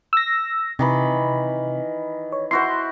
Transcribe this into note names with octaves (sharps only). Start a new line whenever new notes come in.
E6 A#6
C3 D#3 E3 B5
C#5
E4 F#4 C5 C6